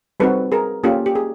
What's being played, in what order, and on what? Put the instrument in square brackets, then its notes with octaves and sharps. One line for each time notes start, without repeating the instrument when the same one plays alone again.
[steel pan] G3 C4 D#4 F#4 A4 B4
G#4 A#4
A#3 C#4 F4 G4 A4
G4
G#4